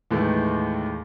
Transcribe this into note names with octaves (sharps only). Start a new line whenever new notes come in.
D#2 A2 D#3 E3 G#3 A3